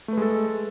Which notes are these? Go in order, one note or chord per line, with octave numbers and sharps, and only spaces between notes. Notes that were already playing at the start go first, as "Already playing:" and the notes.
G#3 A3 A4 B4